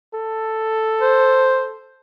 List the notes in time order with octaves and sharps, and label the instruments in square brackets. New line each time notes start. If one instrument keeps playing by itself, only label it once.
[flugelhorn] A4
[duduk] C5